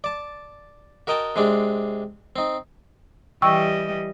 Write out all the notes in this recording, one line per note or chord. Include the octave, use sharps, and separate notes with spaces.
D5 A5
F#4 A#4 D#5 G5 A5
C3 G#3 C4 D4
C4 D#4
E3 G3 D#5 G5 C#6 E6